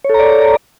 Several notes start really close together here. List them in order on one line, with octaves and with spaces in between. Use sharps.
C#5 A4 A#5 D5